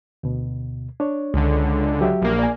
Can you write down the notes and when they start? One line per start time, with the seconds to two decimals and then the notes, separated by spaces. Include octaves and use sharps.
0.23 D2 B2
1.00 D4 C#5
1.34 C#2 D3
2.01 F#3 G4 E5
2.22 A#1 A#3
2.39 D5 G#5